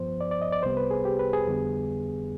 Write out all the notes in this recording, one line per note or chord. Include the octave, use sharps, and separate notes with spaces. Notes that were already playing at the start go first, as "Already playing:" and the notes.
Already playing: G2 F3 B3 C5
D5
D5
D#5
D5
C2 C3 G3 B3 C5
B4
G#4
G4
B4
G#4
F2 D3 G3 B3